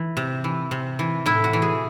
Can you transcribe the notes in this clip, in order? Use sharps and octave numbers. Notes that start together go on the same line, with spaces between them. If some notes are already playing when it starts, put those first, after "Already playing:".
Already playing: E3
C3
E3
C3
E3
A2 E4
F#4
E3
G#4